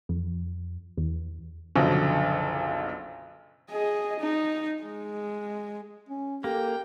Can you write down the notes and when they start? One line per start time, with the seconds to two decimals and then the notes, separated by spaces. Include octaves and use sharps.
0.09 F2
0.97 E2
1.76 F#1 B1 D3 F3 F#3
3.71 G#4 D#5
4.20 D#4
4.82 G#3
6.09 C#4
6.44 A#3 G4 A4 G5